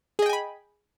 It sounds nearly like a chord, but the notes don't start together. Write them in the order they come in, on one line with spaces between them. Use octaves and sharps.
G#4 D#5 G5 G#5 B5